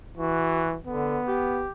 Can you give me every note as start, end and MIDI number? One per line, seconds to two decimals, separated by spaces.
0.18 0.76 52
0.18 0.74 66
0.87 1.19 50
0.87 1.63 59
1.28 1.70 67